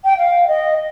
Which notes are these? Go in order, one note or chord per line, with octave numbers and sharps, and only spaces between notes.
G5
F5
D#5